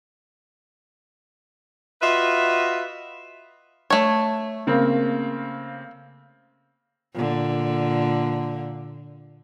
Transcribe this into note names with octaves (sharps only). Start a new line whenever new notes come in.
F4 F#4 B4 D#5 E5
A3 C#5
C#3 A#3 C4
A#2 D3